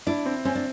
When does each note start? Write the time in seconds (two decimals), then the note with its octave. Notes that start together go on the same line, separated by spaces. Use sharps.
0.07 D4 E4
0.26 C4
0.45 C4 C#4
0.55 D4